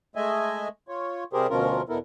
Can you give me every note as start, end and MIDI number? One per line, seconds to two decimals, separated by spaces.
0.16 0.68 56
0.16 0.68 57
0.16 0.68 75
0.16 0.68 76
0.16 0.68 80
0.88 1.24 65
0.88 1.24 73
1.33 1.47 48
1.33 1.47 55
1.33 1.47 67
1.33 1.47 68
1.33 1.47 70
1.33 1.47 72
1.50 1.82 38
1.50 1.82 47
1.50 1.82 53
1.50 1.82 61
1.50 1.82 65
1.50 1.82 70
1.89 1.98 40
1.89 1.98 47
1.89 1.98 59
1.89 1.98 64
1.89 1.98 69
1.89 1.98 70